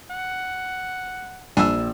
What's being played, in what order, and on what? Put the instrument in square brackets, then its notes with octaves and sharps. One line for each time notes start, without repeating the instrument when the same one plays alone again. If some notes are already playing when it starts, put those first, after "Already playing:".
[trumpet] F#5
[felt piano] A#1 E6 [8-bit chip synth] G3 D4 G#5